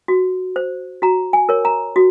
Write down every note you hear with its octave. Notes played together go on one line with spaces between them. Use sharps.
F#4
C5
F#4 A#5
G#5
A#4 C#5
A#5
F#4